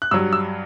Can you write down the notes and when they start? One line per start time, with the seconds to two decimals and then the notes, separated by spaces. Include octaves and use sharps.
0.02 F#6
0.11 G2 F#3 E6
0.33 E6